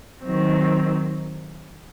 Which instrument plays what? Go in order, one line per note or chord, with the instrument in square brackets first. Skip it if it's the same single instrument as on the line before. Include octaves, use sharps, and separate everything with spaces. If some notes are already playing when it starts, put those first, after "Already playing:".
[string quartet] D#3 F#3 C4